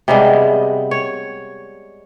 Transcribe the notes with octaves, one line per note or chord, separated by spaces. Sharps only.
C3 G3 G#3 B3
C#5